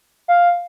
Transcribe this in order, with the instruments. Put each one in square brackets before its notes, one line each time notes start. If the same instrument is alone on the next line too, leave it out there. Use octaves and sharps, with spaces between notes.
[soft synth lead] F5